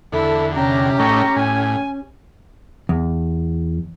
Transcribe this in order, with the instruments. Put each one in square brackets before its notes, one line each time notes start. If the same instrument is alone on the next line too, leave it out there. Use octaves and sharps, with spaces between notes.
[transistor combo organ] E2 D3 [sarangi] E4 [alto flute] A4
[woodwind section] C3 A#5 [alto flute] C#4 [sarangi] G4
[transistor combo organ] A2 A3 D#4 [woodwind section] A#5 C#6
[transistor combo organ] A2 [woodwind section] G#5
[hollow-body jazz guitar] E2